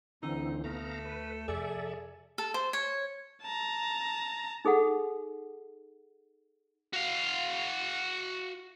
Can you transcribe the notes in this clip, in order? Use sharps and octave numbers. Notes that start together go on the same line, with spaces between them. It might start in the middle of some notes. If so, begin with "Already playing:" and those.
D2 D3 E3 C4 D#4
D3 A3 B3 F5 A#5
B4
F2 C3 G#4 A4 D5 E5
A4
C5
C#5
A5 A#5
D#4 G#4 A4 F#5
F#4 F5